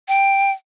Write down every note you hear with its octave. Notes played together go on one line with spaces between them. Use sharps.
G5